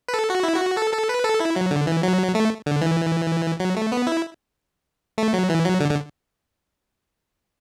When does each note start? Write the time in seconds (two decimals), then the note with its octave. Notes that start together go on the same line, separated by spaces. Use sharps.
0.08 B4
0.14 A4
0.30 F#4
0.43 E4
0.56 F#4
0.77 A4
0.93 A4
1.09 B4
1.24 A4
1.40 E4
1.56 F#3
1.71 D3
1.87 E3
2.03 F#3
2.35 A3
2.66 D3
2.81 E3
3.60 F#3
3.77 A3
3.92 B3
4.07 E4
5.18 A3
5.34 F#3
5.50 E3
5.64 F#3
5.80 D3
5.91 D3